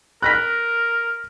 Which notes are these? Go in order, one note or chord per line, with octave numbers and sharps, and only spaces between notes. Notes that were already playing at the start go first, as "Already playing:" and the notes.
A#4 F#6 A#6 B6